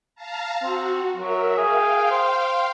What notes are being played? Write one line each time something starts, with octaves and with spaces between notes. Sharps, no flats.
F5 A5 A#5
C4 F#4
F#3 A#4 E5
G#4 F5 G5
C5